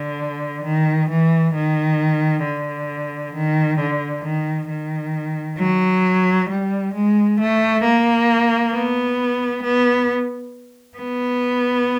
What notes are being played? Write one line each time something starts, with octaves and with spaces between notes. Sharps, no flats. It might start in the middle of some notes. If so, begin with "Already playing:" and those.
Already playing: D3
D#3
E3
D#3
D3
D#3
D3
D#3
D#3
F#3
G3
G#3
A3
A#3
B3
B3
B3